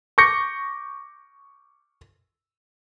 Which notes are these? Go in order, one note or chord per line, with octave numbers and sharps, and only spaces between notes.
C#6 D6 G6 A#6 C#7